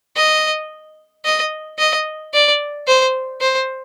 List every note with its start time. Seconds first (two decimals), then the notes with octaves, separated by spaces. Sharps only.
0.16 D#5
1.25 D#5
1.79 D#5
2.34 D5
2.87 C5
3.41 C5